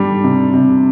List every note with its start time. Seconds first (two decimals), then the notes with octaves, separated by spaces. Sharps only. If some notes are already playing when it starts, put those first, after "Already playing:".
Already playing: G3 D4
0.24 C3
0.53 C3